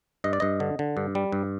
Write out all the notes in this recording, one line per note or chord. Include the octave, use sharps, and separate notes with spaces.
G2 D#5
D5
G2 D#5
D3
D3
G2
G3
G2